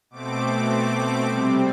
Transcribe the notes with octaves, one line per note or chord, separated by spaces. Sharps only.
B2 A3 C4 D6
C3 G3 C4